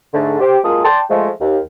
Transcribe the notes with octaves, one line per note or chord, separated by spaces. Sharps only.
G#2 D3 A3
G4 C5
F#2 G#3 A#3 F4 A5 D#6
D5 G5 A5 C6
F3 G#3 A3
D#2